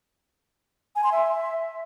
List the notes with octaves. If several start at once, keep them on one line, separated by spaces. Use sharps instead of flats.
G#5
C6
E5